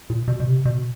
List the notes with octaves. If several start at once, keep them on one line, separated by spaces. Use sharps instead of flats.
A#2
B2
B2
C3
B2